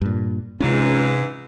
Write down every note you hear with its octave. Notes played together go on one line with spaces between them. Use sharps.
G2 A#2
C#2 G#2 C3 E3 C#4